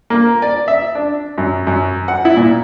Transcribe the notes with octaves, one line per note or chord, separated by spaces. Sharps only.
A#3
D5
E5
D4
F#2
F#2
F#5
E4
A#2